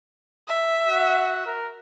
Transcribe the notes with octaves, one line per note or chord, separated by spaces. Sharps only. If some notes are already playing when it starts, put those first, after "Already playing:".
E5
F#4 F#5
A#4